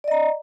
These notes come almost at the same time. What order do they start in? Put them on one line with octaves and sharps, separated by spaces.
D5 D#5 A#5